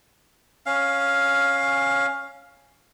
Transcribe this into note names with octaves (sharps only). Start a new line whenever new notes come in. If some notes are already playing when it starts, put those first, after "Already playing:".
C#4 F5